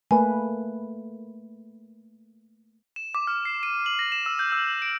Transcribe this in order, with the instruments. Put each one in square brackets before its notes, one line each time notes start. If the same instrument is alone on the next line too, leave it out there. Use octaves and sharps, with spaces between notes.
[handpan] A3 A#3 B4 [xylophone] G#5
[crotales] E7
D6
F6
C7
D#7
F#7
A#6
E7
E6
G6
E6
D7